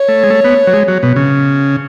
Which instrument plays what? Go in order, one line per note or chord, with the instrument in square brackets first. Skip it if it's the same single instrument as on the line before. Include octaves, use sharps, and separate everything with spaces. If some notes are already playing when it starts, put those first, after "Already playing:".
Already playing: [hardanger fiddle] C#5
[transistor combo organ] A3
G#3
A3
B3
F#3
G#3
F#3
B2
C#3